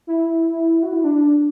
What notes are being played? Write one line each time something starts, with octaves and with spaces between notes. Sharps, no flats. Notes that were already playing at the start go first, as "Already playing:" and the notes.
E4
F#4
E4
D4